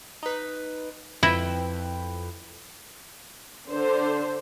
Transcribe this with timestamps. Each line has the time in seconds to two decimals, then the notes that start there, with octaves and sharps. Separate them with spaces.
0.23 D#4 B4
1.23 F2 E4 B4 G5
3.69 D3 C5